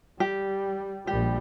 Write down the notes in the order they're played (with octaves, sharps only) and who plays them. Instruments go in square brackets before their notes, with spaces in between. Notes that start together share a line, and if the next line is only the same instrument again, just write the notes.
[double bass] G3 [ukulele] G4
[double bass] A#1 G3 [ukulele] G4